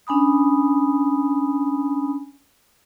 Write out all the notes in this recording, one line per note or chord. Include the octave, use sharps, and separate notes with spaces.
C#4 D4 G#5 B5 D#6